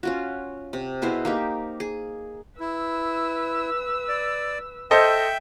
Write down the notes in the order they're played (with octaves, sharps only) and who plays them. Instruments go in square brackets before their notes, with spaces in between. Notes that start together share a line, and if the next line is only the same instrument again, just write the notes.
[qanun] C#4 F4 F#4
C3
B2 E4 G#4 C5
A#3 D#4 G4
G#4
[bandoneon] E4 [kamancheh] B4 E6
[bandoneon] D5
[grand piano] A4 C5 D#5 [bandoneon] E5 G5